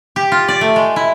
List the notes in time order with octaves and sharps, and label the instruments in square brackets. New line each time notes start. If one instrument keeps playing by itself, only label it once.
[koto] G4
F4
D5
A3
G#3
E4